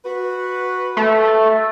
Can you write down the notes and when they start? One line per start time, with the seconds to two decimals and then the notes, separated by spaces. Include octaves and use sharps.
0.04 F#4 B4
0.97 A3